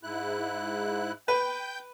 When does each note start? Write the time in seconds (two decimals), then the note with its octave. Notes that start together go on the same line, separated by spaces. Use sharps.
0.03 G#2 E4 F#6
1.28 B4 G5 G6